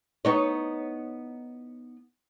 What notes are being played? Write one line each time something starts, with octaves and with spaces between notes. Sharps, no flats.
B3 D#4 C#5